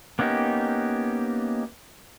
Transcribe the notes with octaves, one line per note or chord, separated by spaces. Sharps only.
A#3 B3 C#4 D#4 G4